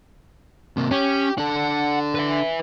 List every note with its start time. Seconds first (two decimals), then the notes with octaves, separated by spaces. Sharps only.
0.77 C3 A#3
0.91 C#4 G4
1.38 D4 A4 F#5
2.15 B4 E5